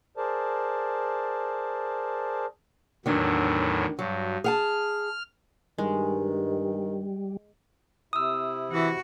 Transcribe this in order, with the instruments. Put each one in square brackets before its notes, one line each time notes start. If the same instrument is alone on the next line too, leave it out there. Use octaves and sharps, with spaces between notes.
[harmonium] G#4 A#4 C5 D5 A5
[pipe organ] E2 A2 F#3 [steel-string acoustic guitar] D#3 D4
[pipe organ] G2 [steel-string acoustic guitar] F#3
[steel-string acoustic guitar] G#4 F#5 A5 [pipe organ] F6
[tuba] G2 [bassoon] D#3 [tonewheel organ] G3 [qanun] G#3
[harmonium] C3 E4 [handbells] D#6 E6
[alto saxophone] E3 [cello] F#4